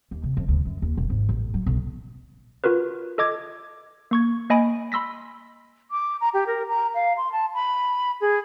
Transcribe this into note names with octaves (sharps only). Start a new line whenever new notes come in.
D#2
C3
F2
D2
F#2
D#2
E1
G#1
A1
F#3
B1
F4 F#4 A#4 B4
A4 D#5 D6 G#6
A#3 C#6 G#6
A#3 D#5 G#5 B5 A#6 D7
B5 C6 E6 A#6 B6
D6
A#5
G4
A#4
A#5
F5
C6
A5
B5
G#4